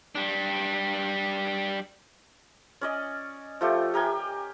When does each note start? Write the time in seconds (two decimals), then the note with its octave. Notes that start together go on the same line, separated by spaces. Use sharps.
0.15 G3 D4
2.81 C#4 D5 D#5
3.61 F3 A3 G4
3.94 G4 A#4 G5 G#5